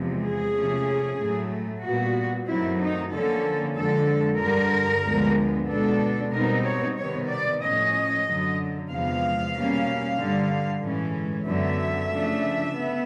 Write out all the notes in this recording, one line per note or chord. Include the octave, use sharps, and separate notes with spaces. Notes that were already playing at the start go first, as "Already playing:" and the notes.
Already playing: E2 C3 F3 G#3
G#4
C3 F3 A3 C#4
A2 F#3 A3
A#2 G3 B3 F#4
F#2 D#3 F#3 A3 C4 E4
D#4
D3 F3 A#3 C#4 A4
F2 D3 F3 G#3 A4
G2 D3 G3 A#4
D2 D3 F3 G#3 B3
B2 G#3 B3 D4 A4
B2 G3 C4 D#4 A#4
C#5
C3 D#3 G3 B3 C#5
D5
A2 F3 A3 C#4 D#5
F#2 D3 F#3
E2 C3 F3 G#3 B3 F5
B2 G3 A#3 C#4
G2 D3 G3
A2 E3 G#3 C#4
F#2 D3 F#3 B3 E5
C#3 F3 A3 D4
B3